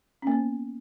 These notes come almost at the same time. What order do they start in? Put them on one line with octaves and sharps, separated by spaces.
C#4 A#3 B3